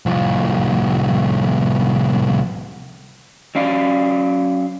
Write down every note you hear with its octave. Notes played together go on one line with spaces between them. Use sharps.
C2 F3
F#3 C#4 D5 F5